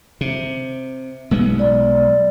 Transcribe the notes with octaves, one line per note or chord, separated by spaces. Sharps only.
C3
B1 G#3 B3
D5